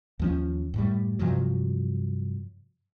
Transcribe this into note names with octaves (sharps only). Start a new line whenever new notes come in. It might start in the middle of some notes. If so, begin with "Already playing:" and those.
D#2 F3 C#4
F#2 A2 G3
G2 C3 F3 F#3